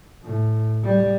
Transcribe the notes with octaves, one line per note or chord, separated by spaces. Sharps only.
A2
G3